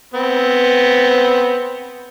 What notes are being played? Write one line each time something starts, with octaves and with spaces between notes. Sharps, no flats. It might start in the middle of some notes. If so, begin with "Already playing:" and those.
B3 C4